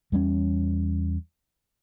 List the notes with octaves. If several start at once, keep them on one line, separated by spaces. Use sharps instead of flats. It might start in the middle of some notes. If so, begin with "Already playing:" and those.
E2 G3 A3 C#4